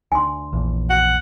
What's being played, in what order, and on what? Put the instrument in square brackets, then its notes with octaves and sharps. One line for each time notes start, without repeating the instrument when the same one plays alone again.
[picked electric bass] D2 [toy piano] G#5 C6
[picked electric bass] A#1 E2
[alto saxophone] F#5